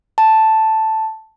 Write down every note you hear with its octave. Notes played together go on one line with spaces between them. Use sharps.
A5